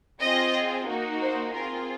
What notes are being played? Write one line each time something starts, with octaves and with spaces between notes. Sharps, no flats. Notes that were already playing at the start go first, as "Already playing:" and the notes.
C4 F4 G#4 D#5
A#3 D#4 F#4
C5
C4 F4 G#4 A#4